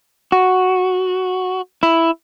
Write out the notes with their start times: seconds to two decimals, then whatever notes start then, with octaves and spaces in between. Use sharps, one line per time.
0.32 F#4
1.83 E4